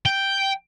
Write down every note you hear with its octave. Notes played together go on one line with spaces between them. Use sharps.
G5